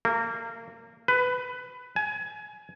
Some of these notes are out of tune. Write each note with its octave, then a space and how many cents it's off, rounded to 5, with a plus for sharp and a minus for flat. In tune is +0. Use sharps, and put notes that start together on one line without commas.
A#3 -25
B4 +15
G#5 +25